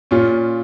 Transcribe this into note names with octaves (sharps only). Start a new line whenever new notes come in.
A#2 C#4 F4